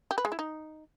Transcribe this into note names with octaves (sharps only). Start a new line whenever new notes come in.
G4
B4
G#3
E4
D#4